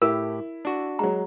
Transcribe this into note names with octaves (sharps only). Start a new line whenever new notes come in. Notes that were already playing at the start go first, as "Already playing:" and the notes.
A2 E4 G4 A#4
D4 F#4
F#3 G#3 A#5